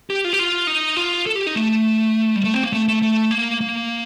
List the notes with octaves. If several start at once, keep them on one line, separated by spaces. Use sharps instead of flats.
G4
F4
G4
F4
D#4
F4
A4
G4
D#4
A3
G3
A3
C4
A#3
A3
A3
A3
A#3
A#3